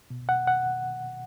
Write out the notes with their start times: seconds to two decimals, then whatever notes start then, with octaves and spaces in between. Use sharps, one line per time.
0.10 B2
0.29 F#5
0.47 F#5